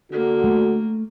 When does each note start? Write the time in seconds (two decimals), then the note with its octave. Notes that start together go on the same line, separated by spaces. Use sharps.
0.12 D3 A#3 F#4
0.44 A3